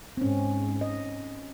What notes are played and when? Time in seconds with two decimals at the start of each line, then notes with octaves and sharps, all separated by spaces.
0.17 G#2 C4 C#4
0.81 D#5